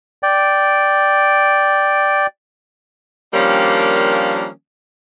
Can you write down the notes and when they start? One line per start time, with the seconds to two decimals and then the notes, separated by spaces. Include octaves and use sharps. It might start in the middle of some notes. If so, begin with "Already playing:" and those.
0.23 D5 G5
3.34 D#3 F3 G3 A#3 C#4 D4